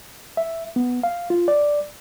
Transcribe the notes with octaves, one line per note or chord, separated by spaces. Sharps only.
E5
B3
F5
F4
D5